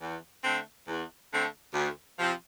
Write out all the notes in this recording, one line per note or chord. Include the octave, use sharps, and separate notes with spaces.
E2
D3 A3 C4
E2
D3 A3 C4
D2
C3 F3 C4